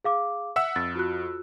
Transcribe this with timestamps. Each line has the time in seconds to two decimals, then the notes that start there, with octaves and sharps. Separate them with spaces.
0.04 G#4 F5 D6
0.56 E5 F#5 E6
0.76 F2 A6
0.95 F4 F#4 F#6